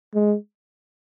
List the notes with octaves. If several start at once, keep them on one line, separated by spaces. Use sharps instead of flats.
G#3